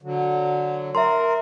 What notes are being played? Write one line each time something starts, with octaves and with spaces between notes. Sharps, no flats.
D3 F#3
A#4 E5 A#5 C6